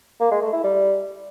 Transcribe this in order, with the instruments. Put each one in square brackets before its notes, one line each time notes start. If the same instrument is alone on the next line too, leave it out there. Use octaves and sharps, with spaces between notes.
[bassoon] A#3
G#3
A3
E4
G3